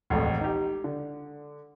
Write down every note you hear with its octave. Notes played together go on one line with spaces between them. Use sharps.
E1 A1 F2 A2
D#4 G4
D3